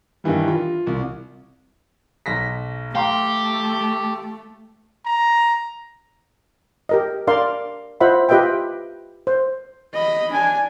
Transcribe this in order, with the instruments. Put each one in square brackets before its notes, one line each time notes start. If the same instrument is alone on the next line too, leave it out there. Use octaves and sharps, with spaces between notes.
[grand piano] G2 D#3 E3 G3
F4
C2
B1 A#6 B6
[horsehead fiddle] A3 [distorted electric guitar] G4 [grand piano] F5 A#5 C6
[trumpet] A#5
[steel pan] G4 A#4 D#5
D4 A#4 D5 F5 C6
F4 C5 D#5 E5 F#5 B5
F4 G4 B4 D#5 E5 G5
C5
[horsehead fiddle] D#5 B5
D4 G#5